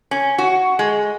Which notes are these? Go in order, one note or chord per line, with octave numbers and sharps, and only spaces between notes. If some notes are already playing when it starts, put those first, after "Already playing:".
C#4
F#4
G#3